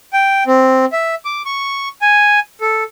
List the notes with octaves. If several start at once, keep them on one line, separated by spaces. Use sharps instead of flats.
G5
C4
E5
D6
C#6
G#5
A4